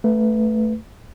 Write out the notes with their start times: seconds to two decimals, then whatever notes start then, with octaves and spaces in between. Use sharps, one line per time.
0.04 A3 B4